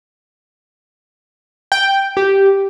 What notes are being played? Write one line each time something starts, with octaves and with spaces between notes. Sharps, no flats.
G5
G4